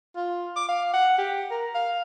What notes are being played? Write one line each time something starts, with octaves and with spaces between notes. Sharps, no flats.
F4
D6
F5
F#5
G4
A#4
F5